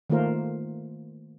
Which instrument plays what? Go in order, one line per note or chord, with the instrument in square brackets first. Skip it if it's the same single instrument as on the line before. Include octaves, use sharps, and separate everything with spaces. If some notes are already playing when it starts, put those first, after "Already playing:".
[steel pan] D#3 A3 A#3 F4 A#4 C5